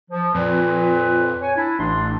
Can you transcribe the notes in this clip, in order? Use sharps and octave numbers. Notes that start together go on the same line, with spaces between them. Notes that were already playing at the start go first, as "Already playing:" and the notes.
F3
F2 A#2 B4
C#5 G#5
D4 E4
A1 D4 C6